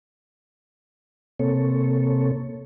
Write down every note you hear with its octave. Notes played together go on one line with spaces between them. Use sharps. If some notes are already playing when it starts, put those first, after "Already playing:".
C3 A#3 C4 A4 C#5